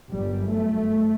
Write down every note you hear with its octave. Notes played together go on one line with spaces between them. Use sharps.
G1 F#2 G3
A3